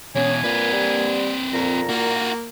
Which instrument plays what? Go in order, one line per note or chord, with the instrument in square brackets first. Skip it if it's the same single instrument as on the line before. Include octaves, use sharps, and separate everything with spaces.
[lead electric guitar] E2 B2 [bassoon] C#4 [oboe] G#5
[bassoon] A#2 [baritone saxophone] A#3 [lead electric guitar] C4 B4
[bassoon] G3
[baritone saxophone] F2 [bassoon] A#2 [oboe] A#5
[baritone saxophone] A#3 [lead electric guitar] F4 F#4